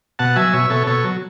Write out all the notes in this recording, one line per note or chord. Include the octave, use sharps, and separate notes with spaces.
B2 F#5 A5
F#3 E5 G#5
B2 C#5 E5
B2 A4 C#5
B2 A4 C#5
F#3